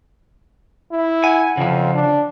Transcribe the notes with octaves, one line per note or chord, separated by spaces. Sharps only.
E4
F#5 G#5
F2 C#3 F3
D4